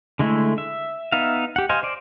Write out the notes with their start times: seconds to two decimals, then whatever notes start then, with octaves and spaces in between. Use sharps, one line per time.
0.19 D3 G#3 A3 E4
0.58 E5
1.12 B3 D#4 E5 F5
1.56 G4 F#5
1.69 C5 D#5 F5 G#5
1.83 C5 D5